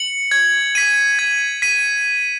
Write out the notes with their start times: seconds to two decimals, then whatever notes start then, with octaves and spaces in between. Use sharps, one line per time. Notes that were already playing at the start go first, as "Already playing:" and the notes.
Already playing: C#7 F#7
0.31 G#6
0.75 B6 D#7
1.19 G#6
1.62 B6 D#7